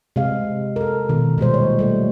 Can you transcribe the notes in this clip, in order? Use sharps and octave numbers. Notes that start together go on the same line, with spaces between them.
C3 G#3 F5
A4 A#4
B2 D#3
A#2 G3 G#3 C5
C#5
G3 A3